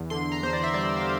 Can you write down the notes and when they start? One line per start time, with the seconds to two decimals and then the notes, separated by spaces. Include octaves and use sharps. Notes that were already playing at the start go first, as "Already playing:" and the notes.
Already playing: E2
0.10 D3 C6
0.32 A#5
0.43 E2 C5
0.53 D5
0.63 E5
0.74 G3 D5
0.97 F5